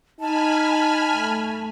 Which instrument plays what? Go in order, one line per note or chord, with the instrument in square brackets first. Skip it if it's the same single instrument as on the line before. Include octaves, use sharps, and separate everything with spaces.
[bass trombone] D#4 [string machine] G#5 B5 F6 [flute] A5
[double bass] A3